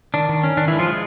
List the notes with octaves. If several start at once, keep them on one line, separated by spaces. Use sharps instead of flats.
D#3 D4
D#3
C#4
D#3 D4
E3 G#3 E4
F3 F4
G#3